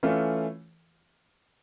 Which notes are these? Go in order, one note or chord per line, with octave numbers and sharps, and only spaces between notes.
E3 A3 C#4 F4